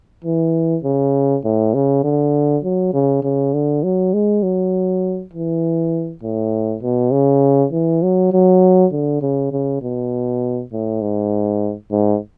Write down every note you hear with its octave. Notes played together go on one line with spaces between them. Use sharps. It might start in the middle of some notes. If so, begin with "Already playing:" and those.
E3
C#3
A2
C#3
D3
F#3
C#3
C#3
D3
F#3
G#3
F#3
E3
A2
B2
C#3
E3
F#3
F#3
D3
C#3
C#3
B2
A2
G#2
G#2